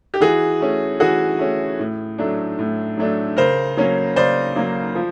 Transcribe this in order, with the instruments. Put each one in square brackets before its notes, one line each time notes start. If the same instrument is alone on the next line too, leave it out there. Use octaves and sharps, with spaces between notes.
[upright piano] G4
E3 F#4 G#4
A3 C#4
E3 F#4 G#4
A3 C#4
A2
F#3 A3 D4
A2
F#3 A3 D4
C#3 A#4 C5
F#3 A#3 C#4
C#3 C5 D5
F#3 A#3 C#4
F3